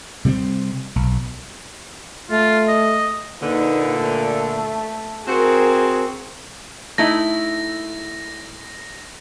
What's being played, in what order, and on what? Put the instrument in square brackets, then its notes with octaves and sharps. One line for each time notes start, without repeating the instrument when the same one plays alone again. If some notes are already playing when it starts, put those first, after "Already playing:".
[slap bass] C3 G3 B3 C4
B1
[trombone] A3 [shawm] F4
[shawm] D#5
[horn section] A#2 D3 [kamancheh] D#4 B4
[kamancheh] A3
[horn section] C4 F#4 [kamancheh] G#4 A#4
[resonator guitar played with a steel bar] A3 D#4 E4 [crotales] A#6